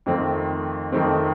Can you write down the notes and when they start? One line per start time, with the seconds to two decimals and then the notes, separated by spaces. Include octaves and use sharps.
0.06 F2 D#3 A3 C4
0.92 F2 D#3 A3 C4